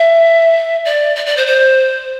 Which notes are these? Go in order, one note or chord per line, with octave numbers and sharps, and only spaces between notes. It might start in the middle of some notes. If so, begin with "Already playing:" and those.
Already playing: E5
D5
D5
D5
C5
C5